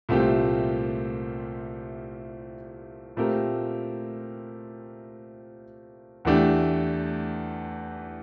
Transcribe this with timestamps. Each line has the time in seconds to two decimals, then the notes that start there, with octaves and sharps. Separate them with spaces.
0.09 C2 A#2 A3 C4 G4
3.17 A#2 A3 C4 G4 A#4
6.25 E2 E3 A3 D4 G4